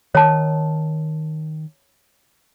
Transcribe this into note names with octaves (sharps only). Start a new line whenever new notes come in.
D#3 C#5 A5